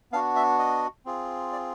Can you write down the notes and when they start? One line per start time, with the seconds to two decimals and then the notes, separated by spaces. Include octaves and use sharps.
0.12 B3 D4 F#4 F5
0.36 E5
0.59 D#5
1.06 C4 F4 G#4
1.52 D5